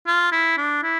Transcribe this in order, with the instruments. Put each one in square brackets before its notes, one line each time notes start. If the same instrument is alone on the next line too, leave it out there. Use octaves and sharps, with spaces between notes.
[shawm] F4
E4
D4
E4